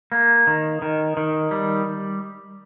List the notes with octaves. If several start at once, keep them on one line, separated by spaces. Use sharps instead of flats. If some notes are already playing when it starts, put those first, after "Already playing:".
A#3
D#3
D#3
D#3
G3